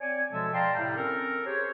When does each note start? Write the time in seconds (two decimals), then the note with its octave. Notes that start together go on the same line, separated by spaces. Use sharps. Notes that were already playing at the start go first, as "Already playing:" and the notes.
0.01 C4 C#5 D5 G#5
0.31 B2 F3 G#3 A4 E5 A5
0.53 D5 F5 G5 A5 A#5 C6
0.75 A2 C3 G3
0.96 C4 C#4 A4 A#4
1.46 G4 G#4 C5 C#5